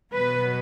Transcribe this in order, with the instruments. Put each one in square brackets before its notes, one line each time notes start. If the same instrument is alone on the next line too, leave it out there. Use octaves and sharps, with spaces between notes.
[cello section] B2 F#3 B3 B4